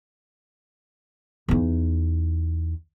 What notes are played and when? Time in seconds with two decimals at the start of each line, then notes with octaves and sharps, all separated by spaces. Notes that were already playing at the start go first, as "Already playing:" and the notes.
1.48 E2 D#4